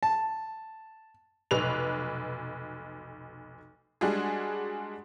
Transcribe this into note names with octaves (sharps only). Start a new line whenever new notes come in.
A5
F1 B1 B4 F7
G3 G#3 D4 F#4 G#4